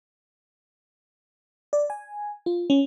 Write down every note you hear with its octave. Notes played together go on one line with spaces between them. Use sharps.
D5
G#5
F4
C#4